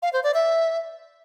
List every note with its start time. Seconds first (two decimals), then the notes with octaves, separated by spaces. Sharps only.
0.02 F5
0.13 C5
0.24 D5
0.34 E5